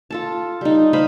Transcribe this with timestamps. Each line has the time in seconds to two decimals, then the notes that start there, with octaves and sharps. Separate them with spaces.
0.10 F4 A4 A5
0.61 G3 D#4
0.93 C5 D#5 F5 B5